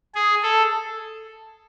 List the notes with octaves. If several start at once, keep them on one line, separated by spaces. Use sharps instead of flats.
G#4
A4